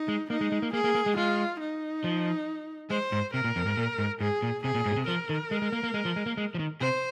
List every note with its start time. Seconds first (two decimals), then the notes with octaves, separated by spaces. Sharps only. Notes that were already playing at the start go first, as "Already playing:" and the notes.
Already playing: D#4
0.08 G#3
0.30 A#3 D#4
0.41 G#3
0.52 G#3
0.62 A#3
0.73 A#3 G#4
0.84 A#3
0.95 A#3
1.06 G#3
1.16 G#3 F4
1.60 D#4
2.04 F3
2.90 G#3 C5
3.12 G#2
3.33 C3 A#4
3.44 A#2
3.56 F2
3.66 G#2
3.77 A#2
3.99 G#2
4.21 G#2 G#4
4.43 A#2
4.64 C3 G#4
4.75 A#2
4.86 G#2
4.92 A#2
4.96 C3
5.07 F3 A#4
5.29 D#3
5.51 G#3
5.62 G#3
5.72 A#3
5.83 A#3
5.94 G#3
6.05 F3
6.16 G#3
6.26 A#3
6.37 G#3
6.55 F3
6.59 D#3
6.80 C3 C5